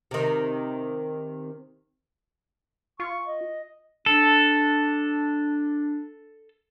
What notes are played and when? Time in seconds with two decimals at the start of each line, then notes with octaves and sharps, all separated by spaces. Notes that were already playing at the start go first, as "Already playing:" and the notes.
0.11 C3 D#3
3.00 F4 C#6
3.27 D#5
4.06 D4 A4